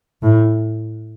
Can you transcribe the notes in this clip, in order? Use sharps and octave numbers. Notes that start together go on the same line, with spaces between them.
A2